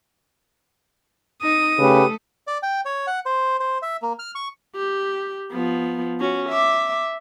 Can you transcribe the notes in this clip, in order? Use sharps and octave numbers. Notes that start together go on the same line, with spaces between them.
D#4 D#6
C#3 A3 G4 A4 B4
D5
G5
C#5
F#5
C5
C5
E5
A#3
F6
C#6
G4
F3 B3
C#4 F#4
E5 D6